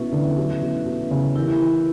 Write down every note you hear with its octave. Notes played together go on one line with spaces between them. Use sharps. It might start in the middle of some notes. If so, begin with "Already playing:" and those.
Already playing: B2 C#4 E4 B4 E5
D3
F#3
B2
B2
C#3
E3 E4 G4 A#4